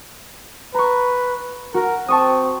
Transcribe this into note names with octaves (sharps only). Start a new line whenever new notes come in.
B4 A#5 C#6
F#4 A#4
C4 A5 C#6 D#6